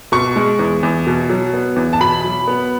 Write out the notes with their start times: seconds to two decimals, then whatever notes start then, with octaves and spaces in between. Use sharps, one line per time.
0.12 B2 C#6
0.36 G#3
0.59 E2
0.83 E2
1.07 B2
1.29 F#3
1.54 B3
1.76 E2
1.93 A5
2.01 B2 B5
2.24 F#3
2.47 B3